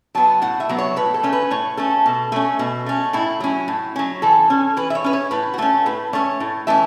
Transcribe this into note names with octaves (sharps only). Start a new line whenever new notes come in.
F#3 B3 A5
A2 F#5
E5
F#3 B3
C#5
A2 B4
A4
A3 C#4
B4
A2 C#5
A3 C#4 A4
B2
A3 C#4
B2
A3 C#4
A2 E4
F#3 C#4
A2
F#3 C#4
E3 A4
C#4
E3 B4
E5
C#5
C#4 B4
C#5
A2 B4
F#4
A3 C#4 A4
A2 B4
A3 C#4 C#5
A2
E3 A3 C#4 E5